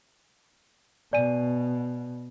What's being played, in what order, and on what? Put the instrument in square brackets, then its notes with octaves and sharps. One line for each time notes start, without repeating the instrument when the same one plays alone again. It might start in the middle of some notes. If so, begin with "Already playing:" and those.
[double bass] B2 [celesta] D5 G#5 D#7